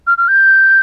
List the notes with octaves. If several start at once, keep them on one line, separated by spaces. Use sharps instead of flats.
F6
F6
G6